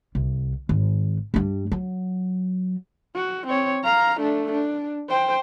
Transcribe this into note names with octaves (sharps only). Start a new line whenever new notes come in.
C2
G#1
G2 G3
F#3
F#4
C4 C#5
F5 A#5
A3 D4
D4
C5 G5